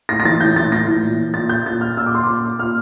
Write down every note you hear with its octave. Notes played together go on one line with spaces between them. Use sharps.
A2 A#6
A#6
E3 A6
A2 G6
E3 A6
A2 A#6
E3
A#2
A#2 A6
G6
A#2 A6
F6
A#2 E6
D6
C6
A#2 D6
A#2 F6